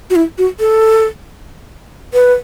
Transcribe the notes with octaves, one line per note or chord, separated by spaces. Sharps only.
F#4
E4
F#4
A4
B4